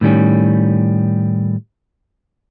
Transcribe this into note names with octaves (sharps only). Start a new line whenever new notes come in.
A2 D#3 G3 C#4